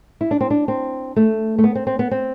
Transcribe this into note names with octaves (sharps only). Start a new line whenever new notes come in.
E4
D4
C4
D4
C4
A3
A3
B3
C4
C4
B3
C4